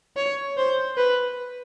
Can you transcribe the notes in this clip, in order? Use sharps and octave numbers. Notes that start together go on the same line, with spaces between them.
C#5
C5
B4